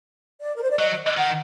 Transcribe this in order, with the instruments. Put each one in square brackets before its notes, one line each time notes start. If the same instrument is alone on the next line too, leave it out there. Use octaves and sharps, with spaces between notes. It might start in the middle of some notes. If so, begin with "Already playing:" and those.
[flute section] D5
A#4
C5
D5
[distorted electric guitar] F#3 [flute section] D#5
[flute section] D#5
D#5
[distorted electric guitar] D#3 [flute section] F#5